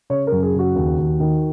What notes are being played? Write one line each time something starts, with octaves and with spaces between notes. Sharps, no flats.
C#3 C#5
F#2 A#4
G#4
C#3 F#4
D#2
D#2
D#3